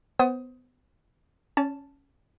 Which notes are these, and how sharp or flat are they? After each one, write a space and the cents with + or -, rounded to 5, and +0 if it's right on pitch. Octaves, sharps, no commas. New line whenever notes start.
B3 +25 C5 +15 D#6 +20
C#4 +0 D5 -45 A5 +0